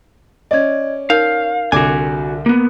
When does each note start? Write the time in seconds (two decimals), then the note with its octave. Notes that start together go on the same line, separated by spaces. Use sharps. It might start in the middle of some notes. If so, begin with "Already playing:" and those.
0.51 C#4 D5 D#5 G#6
1.10 D#4 A#4 F5 G6
1.72 C2 D3 F#4 G#5 D6
2.46 A#3 B3